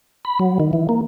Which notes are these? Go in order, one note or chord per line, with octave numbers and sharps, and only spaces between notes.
B5
F#3
D#3
E3
A#3